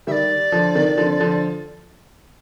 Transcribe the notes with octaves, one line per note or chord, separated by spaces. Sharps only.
D#3 G3 D5 E5
D3 F3
C3 D#3
D3 F3
D3 F3